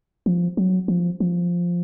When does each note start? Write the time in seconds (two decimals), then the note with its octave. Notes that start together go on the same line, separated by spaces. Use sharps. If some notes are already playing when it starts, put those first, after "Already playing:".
0.26 F3
0.57 F#3
0.88 F3
1.20 F3